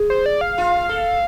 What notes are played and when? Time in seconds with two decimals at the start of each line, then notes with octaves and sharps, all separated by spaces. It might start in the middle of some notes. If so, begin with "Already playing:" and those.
Already playing: G#4
0.10 C5
0.26 D5
0.41 F5
0.58 F4
0.89 A4